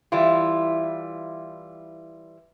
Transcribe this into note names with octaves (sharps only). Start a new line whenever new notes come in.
E3 G3 E4 F4